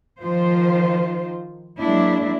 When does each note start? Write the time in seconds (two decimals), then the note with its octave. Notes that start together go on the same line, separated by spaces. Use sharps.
0.22 D#3 F3 F4 C5
1.79 F#3 G#3 A#3 D4 E4